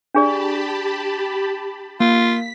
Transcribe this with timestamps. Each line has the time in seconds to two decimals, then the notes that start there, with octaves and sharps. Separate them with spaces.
0.15 D4 G4 G#4 D5 A5 B5
2.00 A#3 F4 B6